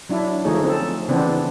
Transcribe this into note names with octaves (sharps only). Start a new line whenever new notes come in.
F#3 D4 E4
D3 F3 A3 D#4 G#4 C#5
C4 A4
C#3 E3 B3 C4 D4